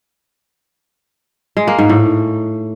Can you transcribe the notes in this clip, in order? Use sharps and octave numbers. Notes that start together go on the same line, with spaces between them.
G#3
A#3
G#2
A2